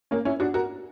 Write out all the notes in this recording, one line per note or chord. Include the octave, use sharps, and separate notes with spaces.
A#3 C#4
C#4 E4
D4 F#4
F#4 A#4